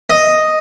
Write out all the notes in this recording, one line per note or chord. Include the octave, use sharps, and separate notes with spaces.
D#5